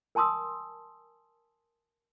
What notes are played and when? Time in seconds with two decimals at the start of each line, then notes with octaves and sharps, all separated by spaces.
0.15 A#4 G#5 A5 C6 D#6 E6